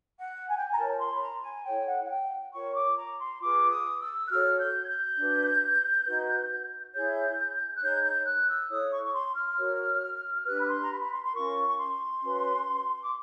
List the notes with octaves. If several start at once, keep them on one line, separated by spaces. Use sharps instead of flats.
F#5
G#5
G5
G#5
A#5
F4 A#4 C#5 A5
C6
B5
A#5
G#5
E4 A4 C#5 G5
F#5
F#5
G5
F4 A#4 C#5 C#6
D6
A#5
C6
F4 G#4 B4 D6
D#6
E6
F#6
F#4 A4 C#5 F6
G6
G#6
G6
D4 F#4 B4
D#4 F#4 B4
E4 G#4 C#5 G6
F#6
D#4 G#4 C#5 G6
G6
F#6
E6
E4 A4 C#5 D#6
C#6
C#6
C6
F6
F#4 A#4 C#5
D4 G4 B4 F#6
B5
C6
A#5
B5
B5
C6
C6
C#4 F4 A#4 C#6
C#6
C6
C#4 F#4 B4
D6